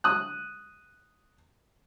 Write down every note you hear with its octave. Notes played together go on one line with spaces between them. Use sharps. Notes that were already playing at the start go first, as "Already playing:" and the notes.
D#6 F#6